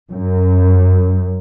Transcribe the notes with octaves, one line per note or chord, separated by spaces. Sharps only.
F#2